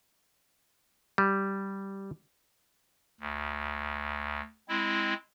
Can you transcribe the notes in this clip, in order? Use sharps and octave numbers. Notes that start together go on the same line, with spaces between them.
G3
D2
G#3 C4 E4